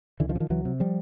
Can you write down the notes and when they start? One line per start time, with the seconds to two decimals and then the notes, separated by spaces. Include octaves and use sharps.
0.20 C#2 D3 E3
0.29 D#3 F3
0.35 C3
0.40 D#3 F3
0.50 C#2 E3 F#3
0.65 C3
0.80 F3 G3